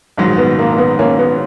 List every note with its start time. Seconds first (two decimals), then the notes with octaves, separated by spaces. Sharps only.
0.18 A#1 G#2 D#3 F#3
0.38 B3
0.59 A#3
0.73 A#3
0.78 B3
0.99 A#3 C#4
1.19 B3